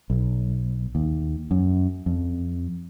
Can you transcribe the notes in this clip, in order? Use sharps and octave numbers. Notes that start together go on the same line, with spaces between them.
B1
D#2
F#2
F2